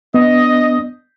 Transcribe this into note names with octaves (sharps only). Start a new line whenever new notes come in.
B3 D4 D#5